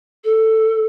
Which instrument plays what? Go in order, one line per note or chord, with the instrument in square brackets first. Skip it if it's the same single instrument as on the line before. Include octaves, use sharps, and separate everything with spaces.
[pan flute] A4